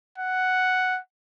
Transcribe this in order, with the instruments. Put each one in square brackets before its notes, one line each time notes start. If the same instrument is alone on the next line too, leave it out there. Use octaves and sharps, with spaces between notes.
[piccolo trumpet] F#5